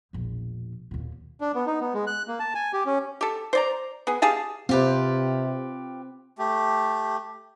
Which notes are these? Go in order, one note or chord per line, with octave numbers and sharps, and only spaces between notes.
E1 A#1
D#2 A#2
D4
B3
D#4
B3
G#3
F#6
A#3
A5
G#5
G4
C#4
G4 A4
C5 D5 A#5
B3 G#4
G4 G#4 F5 A5
C3 C4 F4 G4 B4
A3 G4